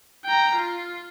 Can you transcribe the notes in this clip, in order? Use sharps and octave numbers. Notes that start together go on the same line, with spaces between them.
G5 A#5
F4